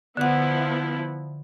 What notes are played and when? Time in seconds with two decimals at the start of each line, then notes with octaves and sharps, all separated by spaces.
0.17 D3 F3 B3 E4 F#5